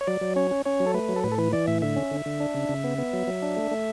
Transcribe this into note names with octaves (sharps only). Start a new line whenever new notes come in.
C#5
F#3 D5
F#3
C#4 C#5
C#4
C#4 C#5
F#3
A4
A3 B4
F#3
A4
A2 B4
A4
E3 B4
E3 D5
A2 E5
D3 E5
C#4
D3
D3
D4
C#3
C#3
B3
B3
F#3
F#3
D4
A3
A3